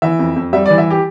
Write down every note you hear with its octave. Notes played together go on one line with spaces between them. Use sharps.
E3 E5
F2
F2
G3 E5
D5
E3
E5
G4